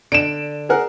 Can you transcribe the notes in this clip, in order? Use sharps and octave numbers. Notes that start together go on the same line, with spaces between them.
D3 D7 E7
G#4 A#4 F#5